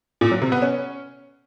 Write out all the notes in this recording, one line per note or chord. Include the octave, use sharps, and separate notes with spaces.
A#2
F#3
C3
B3
C#4